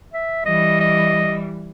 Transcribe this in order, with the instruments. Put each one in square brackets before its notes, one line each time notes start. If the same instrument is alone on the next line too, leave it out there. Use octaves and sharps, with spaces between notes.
[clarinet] E5
[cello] E3 G3 [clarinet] D#5
[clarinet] D#5